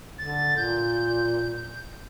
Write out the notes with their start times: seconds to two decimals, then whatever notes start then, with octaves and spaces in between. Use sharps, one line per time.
0.19 D3 A6
0.57 A#2 G6